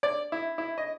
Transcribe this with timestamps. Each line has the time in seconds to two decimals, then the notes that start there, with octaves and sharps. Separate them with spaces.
0.03 D5
0.32 E4
0.58 E4
0.78 D#5